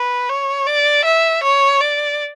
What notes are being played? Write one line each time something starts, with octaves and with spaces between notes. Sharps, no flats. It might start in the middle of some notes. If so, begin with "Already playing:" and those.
Already playing: B4
C#5
D5
E5
C#5
D5